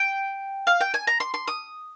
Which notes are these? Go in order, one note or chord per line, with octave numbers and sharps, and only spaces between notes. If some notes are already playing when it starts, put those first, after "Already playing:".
Already playing: G5
F5
G5
G#5
A#5
C6
C6
D#6